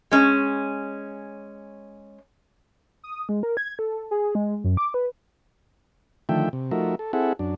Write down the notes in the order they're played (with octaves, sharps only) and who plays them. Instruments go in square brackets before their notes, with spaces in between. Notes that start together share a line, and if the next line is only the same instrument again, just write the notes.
[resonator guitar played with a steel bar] G#3 C#4
[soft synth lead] D#6
G#3
A#4
G#6
A4
G#4
G#3
F#2
D6
B4
[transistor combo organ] D3 D#3 F3 A3 E5 G5
C3
F3 A3 D#4 F#4 A#4 E5
A4
C4 E4 G#4 A4 E5 F#5
F#2 D4